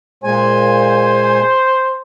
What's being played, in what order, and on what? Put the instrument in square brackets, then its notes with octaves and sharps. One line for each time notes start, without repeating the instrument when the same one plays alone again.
[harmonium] A#2 G#3 G#5 [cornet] C5